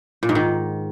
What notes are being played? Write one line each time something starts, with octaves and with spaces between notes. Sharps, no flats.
A#2
G#2
D#3